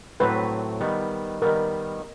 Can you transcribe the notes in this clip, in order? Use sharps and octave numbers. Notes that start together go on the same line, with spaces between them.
A2 F#3 A3 C4 B4
D#3 G3 B3
D#3 G3 B3 A#4